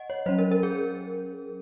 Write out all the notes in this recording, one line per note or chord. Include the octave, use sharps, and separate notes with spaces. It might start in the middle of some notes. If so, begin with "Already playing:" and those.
Already playing: D#5 F#5
C#5
F#3 C#4 C5
A#4
A#4
G#4